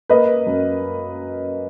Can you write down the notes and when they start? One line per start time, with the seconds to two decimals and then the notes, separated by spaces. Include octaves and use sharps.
0.10 A#3 B4 D#5
0.47 F#2